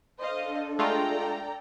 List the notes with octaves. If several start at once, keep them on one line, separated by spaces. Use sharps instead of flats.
D4 A4 C5 D#5 F5
G#3 A3 F4 D5 G5 A#5